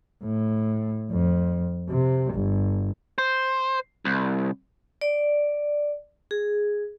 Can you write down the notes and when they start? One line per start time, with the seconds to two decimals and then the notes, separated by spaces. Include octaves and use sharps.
0.24 A2
1.11 F2
1.89 C3
2.34 G1
3.18 C5
4.05 C2
5.01 D5
6.31 G#4